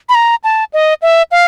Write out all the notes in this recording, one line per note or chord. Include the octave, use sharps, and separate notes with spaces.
B5
A#5
A5
D#5
E5
F5